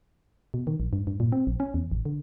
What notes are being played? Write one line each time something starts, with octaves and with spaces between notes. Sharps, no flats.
B2
D#3
A#1
G2
G2
A#2
C4
A#1
C#4
E2
A1
D3